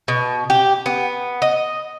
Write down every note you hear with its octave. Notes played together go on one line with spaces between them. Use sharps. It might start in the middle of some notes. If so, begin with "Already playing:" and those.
B2
G4
B3
D#5